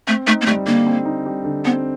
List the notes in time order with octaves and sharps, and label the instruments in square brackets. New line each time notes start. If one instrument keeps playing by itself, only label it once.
[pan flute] A3 [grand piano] C4
[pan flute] A3 [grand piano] D#4
[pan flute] A#3
[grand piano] G3 [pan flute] A3
[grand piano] D3 [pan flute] A#3
[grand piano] C4
D#4
G3
D3
[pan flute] B3 [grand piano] C4